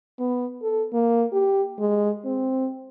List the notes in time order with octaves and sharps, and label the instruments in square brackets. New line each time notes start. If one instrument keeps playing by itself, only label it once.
[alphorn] B3
A4
A#3
G4
G#3
C4